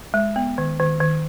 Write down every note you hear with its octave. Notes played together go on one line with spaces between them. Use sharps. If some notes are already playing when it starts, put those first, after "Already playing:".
G#3
B3
D#3
D#3
D#3